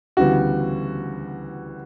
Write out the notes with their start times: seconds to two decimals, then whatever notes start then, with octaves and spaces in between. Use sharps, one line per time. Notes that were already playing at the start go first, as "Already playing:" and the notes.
0.17 D2 C#3 E3 G3 B3 F#4